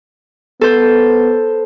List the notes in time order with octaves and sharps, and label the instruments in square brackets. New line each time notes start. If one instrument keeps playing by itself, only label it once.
[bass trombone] B3 [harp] A4 C5